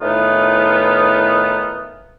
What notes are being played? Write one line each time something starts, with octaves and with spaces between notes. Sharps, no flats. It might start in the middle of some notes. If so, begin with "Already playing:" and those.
A2 D#3 E3 B3 D#4 F4